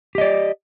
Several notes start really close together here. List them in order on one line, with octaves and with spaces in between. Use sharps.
G4 D#5 D5